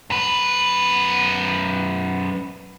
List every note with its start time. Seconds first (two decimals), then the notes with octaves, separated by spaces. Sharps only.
0.10 F#2 B4